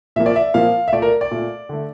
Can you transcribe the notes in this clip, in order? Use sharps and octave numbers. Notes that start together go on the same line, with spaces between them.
A#2 F3 A#3 E5
D5
E5
A#2 F3 A#3 F5
E5
A#2 A3 D5
A#4
D5
A#2 A3
D3 A3